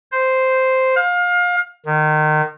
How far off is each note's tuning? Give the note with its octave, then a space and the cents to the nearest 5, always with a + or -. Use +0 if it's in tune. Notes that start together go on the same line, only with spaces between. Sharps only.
C5 -5
F5 +30
D#3 -25